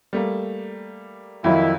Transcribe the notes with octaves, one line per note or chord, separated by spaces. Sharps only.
G3 A3 A#3
F2 D#3 F#3 E4 F4